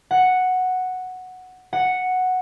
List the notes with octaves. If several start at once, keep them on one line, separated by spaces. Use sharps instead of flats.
F#5
F#5